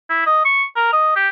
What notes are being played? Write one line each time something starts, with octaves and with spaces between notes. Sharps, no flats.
E4
D#5
C#6
A#4
D#5
G4